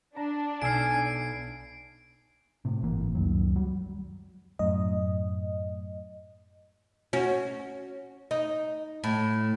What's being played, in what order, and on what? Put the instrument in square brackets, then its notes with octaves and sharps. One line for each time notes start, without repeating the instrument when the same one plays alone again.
[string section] D4 [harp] A#5
[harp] B1 E6 F6 [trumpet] G#5 [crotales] C7 D7
[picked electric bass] A2 C3
G1 A2 E3 A#3
C#2 F#2 D#3 F#3
F#3 G3
[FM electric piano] F#2 A2 D#5
[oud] C#4 F#4
D#4
A2